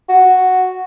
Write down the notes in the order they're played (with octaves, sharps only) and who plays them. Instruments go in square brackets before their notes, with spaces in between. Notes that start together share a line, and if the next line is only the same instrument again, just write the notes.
[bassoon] F#4